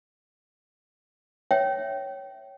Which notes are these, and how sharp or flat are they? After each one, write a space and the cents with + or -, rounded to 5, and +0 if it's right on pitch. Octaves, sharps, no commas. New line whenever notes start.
C#5 +0 E5 +0 G5 -20